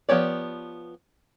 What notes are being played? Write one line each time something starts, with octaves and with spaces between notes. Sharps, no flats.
F3 B3 G4 C#5 D5